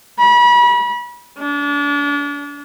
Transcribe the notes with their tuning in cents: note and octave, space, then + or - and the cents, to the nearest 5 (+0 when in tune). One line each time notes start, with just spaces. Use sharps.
B5 -35
D4 -35